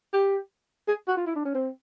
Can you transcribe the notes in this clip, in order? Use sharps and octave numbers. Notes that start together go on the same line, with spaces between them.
G4
G#4
F#4
F4
E4
D4
C#4
C4